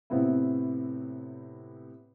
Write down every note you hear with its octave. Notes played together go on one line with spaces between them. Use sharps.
A2 C3 B3 C4 E4